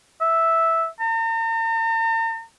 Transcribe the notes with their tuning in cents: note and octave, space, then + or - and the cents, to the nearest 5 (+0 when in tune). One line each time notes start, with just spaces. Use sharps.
E5 -5
A#5 -45